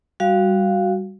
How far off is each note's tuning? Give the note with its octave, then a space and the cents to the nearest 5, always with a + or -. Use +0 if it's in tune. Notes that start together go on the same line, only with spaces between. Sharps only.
G3 +0 F#4 +0 F5 +0